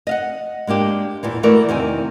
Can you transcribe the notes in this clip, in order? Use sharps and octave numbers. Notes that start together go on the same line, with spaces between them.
D#5 F5 F#5
G#3 A#3 D4 G4
E2 A#2 E3
E3 A3 F#4 A#4 D5
E2 C3 D#3 G#5